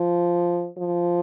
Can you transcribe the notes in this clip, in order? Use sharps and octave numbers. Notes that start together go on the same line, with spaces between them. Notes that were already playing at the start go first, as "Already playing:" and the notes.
Already playing: F3
F3